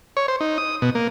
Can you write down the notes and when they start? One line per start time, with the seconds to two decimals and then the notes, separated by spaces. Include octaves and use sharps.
0.17 C#5
0.28 C5
0.41 D#4
0.58 D#6
0.82 B2
0.95 A#3